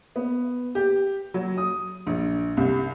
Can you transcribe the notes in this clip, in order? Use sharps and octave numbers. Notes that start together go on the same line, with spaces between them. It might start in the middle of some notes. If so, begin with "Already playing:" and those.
B3
G4
F#3
D#6
A#1
C2